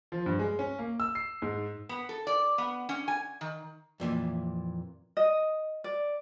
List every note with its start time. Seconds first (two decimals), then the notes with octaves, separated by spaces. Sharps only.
0.12 F3
0.26 G2
0.39 G#3
0.59 C#4
0.79 A#3
1.00 E6
1.15 C7
1.42 G#2
1.89 B3
2.09 A4
2.27 D5
2.58 B3
2.89 C#4
3.08 G#5
3.41 D#3
4.00 F2 A#2 E3
5.17 D#5
5.84 D5